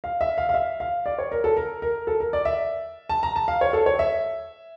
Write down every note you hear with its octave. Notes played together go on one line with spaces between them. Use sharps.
F5
E5
F5
F5
E5
F5
D5
C#5
A#4
A4
A#4
A#4
A4
A#4
D5
E5
A5
A#5
A5
F5
C#5
A4
C#5
E5